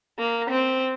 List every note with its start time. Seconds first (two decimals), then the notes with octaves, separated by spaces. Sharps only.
0.19 A#3
0.50 C4